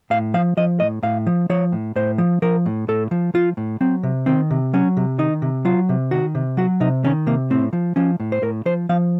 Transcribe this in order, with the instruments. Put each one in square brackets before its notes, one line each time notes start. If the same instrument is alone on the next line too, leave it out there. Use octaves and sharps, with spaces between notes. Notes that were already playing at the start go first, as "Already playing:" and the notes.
[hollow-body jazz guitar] A2 F5
F3 F5
F3 D#5
A2 D#5
A2 F5
F3
F3 C#5
A2
A2 C5
F3
F3 A#4
A2
A2 A4
F3
F3 F4
A2
F#3 C4
C3
D#3 C4
C3
F#3 C#4
C3
D#3 D#4
C3
F#3 F4
C3
D#3 F#4
C3
F#3 F#4
C3 D#4
D#3 C#4
C3 A#3
A2 C4
F3
F3 C#4
A2
C5
A2 A#4
F3 C5
F3 F5